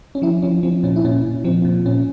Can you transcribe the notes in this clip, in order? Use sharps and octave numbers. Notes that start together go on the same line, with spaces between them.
C#4
F3 E4
F3 C#4
F3 C4
A#2 C#4
E4
A#2 C#4
A#2
F3 C4
A#2
A#2 C#4